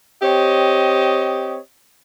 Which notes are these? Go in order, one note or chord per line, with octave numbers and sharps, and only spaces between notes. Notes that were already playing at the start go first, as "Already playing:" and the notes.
C4 G4 C#5 D#5